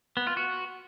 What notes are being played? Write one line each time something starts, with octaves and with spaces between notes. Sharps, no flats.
B3
F4
F#4